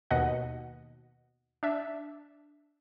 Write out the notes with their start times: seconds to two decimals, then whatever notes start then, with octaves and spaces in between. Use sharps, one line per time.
0.11 D#2 B2 D#5 F#5
1.63 D4 E5